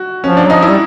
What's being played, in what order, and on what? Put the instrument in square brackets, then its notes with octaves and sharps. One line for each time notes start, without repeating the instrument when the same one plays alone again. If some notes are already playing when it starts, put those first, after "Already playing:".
Already playing: [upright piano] F#4
[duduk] F3 [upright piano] C#4
[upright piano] D4
[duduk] F#3
[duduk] F3 [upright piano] D#4
[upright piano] E4
[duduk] G3